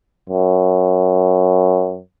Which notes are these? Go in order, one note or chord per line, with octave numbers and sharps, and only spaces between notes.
F#2